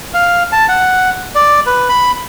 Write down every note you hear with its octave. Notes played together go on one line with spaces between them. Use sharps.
F5
A5
F#5
D5
B4
B5